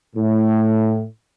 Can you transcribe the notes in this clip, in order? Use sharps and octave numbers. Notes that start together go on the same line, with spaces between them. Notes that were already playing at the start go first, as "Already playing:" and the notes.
A2